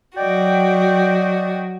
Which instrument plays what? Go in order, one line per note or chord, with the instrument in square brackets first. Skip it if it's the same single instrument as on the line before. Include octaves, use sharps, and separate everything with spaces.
[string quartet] F#3 F#4 [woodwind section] D5 D#5 G5